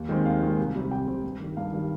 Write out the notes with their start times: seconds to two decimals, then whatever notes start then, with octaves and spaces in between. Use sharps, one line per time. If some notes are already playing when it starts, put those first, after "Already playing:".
Already playing: D#2
0.09 D#3 G#3 C4
0.25 D#2 F5
0.42 D#3 G#3 C4
0.59 C2
0.75 C3 G3 C4
0.91 C2 G5
1.07 C3 G3 C4
1.24 G2
1.39 D#3 G3
1.57 G2 F5
1.72 D#3 G3